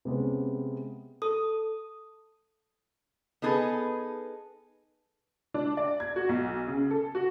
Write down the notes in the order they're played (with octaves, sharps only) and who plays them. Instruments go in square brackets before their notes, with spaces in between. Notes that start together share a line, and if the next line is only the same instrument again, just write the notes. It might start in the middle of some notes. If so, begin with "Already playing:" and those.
[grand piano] C3 G#3 B3 C#4
[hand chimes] A4 D#6
[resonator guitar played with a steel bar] B3 D#4 G#4 A4 B4
[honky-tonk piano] D4
D5
G#6
F#4
B1
C#3
A4
F#4